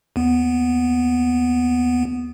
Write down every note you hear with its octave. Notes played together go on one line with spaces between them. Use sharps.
D#2 B3